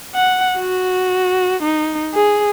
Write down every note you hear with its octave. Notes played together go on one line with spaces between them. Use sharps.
F#5
F#4
D#4
G#4